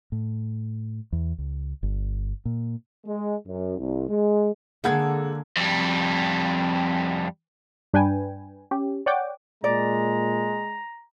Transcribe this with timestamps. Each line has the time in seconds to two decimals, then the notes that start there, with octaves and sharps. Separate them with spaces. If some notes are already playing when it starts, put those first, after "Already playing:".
0.12 A2
1.12 E2
1.38 C#2
1.83 G1
2.45 A#2
3.05 G#3
3.46 F#2
3.77 C2
4.09 G#3
4.84 D3 G#3 A#3 G#4 A4 F#5 G#6
5.57 F2 G3
7.93 G2 D4 B4 G5 G#5
8.71 C#4 G4
9.06 C#5 D5 F#5 G5 D6
9.64 A#2 G#3 D5 A#5